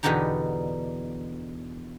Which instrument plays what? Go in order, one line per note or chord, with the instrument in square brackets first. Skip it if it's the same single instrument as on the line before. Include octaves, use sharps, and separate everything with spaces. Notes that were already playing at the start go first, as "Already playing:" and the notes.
[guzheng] E2 B2 D3 D#4 G4 A#5